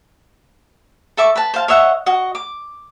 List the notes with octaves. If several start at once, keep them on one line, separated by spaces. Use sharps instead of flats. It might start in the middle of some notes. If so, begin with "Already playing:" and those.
A4 E5 C#6 D6
B4 A5
C5 F5 A5
C#5 D#5 E5 F#5
F#4 D#5
D6